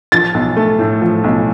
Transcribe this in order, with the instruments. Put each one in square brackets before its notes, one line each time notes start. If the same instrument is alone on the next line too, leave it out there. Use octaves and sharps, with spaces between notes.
[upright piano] F3 A6
B1
A3
A2
F3
B1